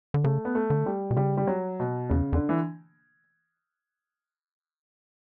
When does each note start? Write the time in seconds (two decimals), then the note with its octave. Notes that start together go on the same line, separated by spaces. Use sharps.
0.14 D3
0.24 C#3 A3
0.45 B3
0.55 A3
0.70 D3
0.86 G3
1.11 B2
1.16 C#3 G3
1.37 G3
1.47 F#3
1.80 B2
2.09 E2 C#3
2.33 E2 D3
2.49 E3